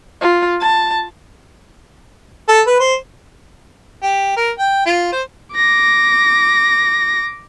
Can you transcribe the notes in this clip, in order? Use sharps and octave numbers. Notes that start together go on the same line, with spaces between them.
F4
A5
A4
B4
C5
G4
A#4
G5
F4
C5
D6 A#6